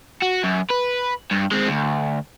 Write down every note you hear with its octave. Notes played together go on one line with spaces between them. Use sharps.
F#4
F#2
B4
G2
G#3 C4
D2